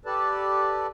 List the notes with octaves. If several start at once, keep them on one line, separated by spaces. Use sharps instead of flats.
G4 A4 B4 D5 A5